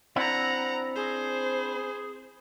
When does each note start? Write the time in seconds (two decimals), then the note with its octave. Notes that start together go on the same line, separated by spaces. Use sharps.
0.16 C4 D4 E4 F#5 A#5
0.96 G#4 C5